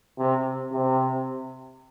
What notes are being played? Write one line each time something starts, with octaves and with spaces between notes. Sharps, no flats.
C3
C3